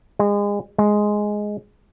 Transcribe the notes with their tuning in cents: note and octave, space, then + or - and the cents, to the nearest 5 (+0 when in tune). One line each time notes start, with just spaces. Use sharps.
G#3 -30
G#3 +5